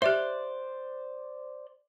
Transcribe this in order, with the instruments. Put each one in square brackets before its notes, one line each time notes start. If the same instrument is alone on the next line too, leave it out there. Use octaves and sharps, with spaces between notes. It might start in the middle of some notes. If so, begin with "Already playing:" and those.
[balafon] G4 E5 [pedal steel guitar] C5 D5 F#6